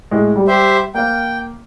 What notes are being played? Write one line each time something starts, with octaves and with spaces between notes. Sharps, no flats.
A2 G#3
G3
G4 C5 E5
A#3 F5 G5